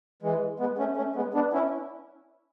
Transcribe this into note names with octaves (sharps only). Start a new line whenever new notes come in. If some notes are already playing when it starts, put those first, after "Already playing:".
E3 G#3
G#3 B3
A3 C#4
A3 C#4
G#3 B3
B3 D4
C#4 E4